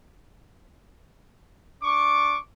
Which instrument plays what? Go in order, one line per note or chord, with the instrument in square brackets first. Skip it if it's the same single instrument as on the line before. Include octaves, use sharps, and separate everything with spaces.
[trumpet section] D4 C#6 D6